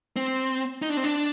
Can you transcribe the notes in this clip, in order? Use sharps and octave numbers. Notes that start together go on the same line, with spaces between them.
C4
D#4
D4
C4
D4